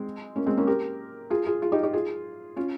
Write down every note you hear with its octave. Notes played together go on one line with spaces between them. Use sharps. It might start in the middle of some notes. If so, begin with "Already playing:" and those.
Already playing: G#3 C4
A#3 C#4
G#3 C4
A#3 C#4
G4 A#4
F4 G#4
F4 G#4
F4 G#4
D#4 G4
D#4 G4
F4 G#4
C#4 F4